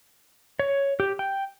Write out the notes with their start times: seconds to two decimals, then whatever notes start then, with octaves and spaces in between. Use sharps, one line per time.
0.60 C#5
1.00 G4
1.19 G5